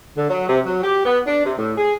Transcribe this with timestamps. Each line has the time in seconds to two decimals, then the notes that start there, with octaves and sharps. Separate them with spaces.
0.16 D3
0.28 F#3
0.48 C3
0.65 F#3
0.82 G4
1.05 B3
1.26 D4
1.44 C3
1.57 A2
1.77 G#4